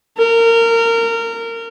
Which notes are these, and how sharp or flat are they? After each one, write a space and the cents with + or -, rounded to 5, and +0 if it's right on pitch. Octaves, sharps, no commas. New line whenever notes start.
A#4 -20